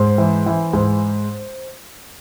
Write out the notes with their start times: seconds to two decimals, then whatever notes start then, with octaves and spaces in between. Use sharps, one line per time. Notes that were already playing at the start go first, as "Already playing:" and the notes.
Already playing: G#2 C5
0.18 E3
0.46 E3
0.73 G#2